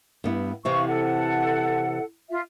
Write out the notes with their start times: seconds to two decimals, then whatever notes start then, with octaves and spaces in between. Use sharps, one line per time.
0.24 G2 B3 E4
0.65 C3 E3 C4 F5 C#6
0.87 A4 F#5
2.30 F4 E5